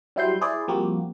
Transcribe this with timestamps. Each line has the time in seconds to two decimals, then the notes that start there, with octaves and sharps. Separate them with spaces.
0.16 F#3 G3 E4 C5 C6 G6
0.41 E4 G#4 C5 D5
0.68 F3 G3 A#3 C4 F#4 G4